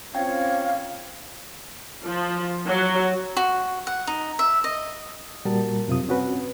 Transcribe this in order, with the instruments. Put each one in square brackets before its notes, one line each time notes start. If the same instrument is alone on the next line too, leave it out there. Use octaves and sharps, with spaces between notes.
[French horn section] C4 C#4 F4 [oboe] C#5 [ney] F5 [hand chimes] G5
[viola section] F3
F#3
[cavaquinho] F#4
F#5
D#4
E5
D#5
[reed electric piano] A#2 G3 F#4 A#4 A5
F#2 C3 F4 D#6
C4 C#4 F#4 B4